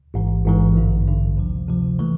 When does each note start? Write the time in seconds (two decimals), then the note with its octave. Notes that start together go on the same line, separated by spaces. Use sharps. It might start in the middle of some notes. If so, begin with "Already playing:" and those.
0.14 A1 G#2 E3
0.44 A1 G#2 E3
0.75 A1 G2 D3
1.07 A1 G2 D3
1.37 D2 C3 F3
1.68 D2 C3 F3
1.99 E3 A3